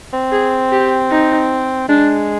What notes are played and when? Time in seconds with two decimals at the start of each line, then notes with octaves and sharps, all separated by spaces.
0.14 C4
0.32 G#4
0.72 G4
1.11 D#4
1.89 G#3 D4